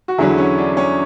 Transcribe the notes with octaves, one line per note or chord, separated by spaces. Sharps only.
F#4
E2 D3 F#3 E4 G#4
C#4
D4
C#4